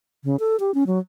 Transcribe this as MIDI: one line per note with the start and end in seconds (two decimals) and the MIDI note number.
0.24 0.36 49
0.40 0.56 69
0.60 0.74 67
0.74 0.84 61
0.87 0.99 54